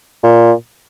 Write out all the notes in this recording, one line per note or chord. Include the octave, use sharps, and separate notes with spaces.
A#2